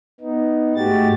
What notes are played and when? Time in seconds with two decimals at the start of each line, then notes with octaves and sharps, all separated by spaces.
0.21 B3 D#4
0.76 G#2 G#3 A3 F#4 G4 A6